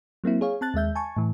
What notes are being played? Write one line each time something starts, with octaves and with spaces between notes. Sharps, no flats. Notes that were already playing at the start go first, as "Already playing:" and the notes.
F#3 A#3 C4 E4
G#4 C#5 F5
C4 A5 F#6 A6
D#2 G#3 E5 G6
G#5 A5 C#6
A2 E3